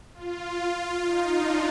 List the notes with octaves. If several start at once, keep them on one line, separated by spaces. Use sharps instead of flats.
F4
D#4
D4